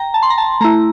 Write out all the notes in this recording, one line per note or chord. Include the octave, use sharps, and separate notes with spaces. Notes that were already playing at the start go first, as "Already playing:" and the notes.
Already playing: G5 A#5
A5
C6
A#5
A5
A3 E4 A#5